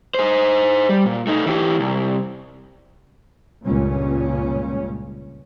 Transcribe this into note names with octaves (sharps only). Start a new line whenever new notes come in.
G#4 C5
G3
A#2
A3 D#4
E3 G4
C2
C#2 G2 A#2 C#3 C#4